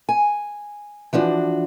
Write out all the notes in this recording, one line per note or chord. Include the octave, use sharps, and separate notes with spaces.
G#5
E3 F3 D4 F#4